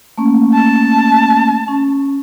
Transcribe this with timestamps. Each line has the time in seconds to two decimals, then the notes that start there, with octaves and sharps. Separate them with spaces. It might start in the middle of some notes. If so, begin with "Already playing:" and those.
0.18 A3 A#3 C#4
0.54 A5
1.68 C#4